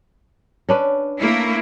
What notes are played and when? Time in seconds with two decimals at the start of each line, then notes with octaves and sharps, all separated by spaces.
0.69 C#4 D4 B4
1.18 A3 A#3 E4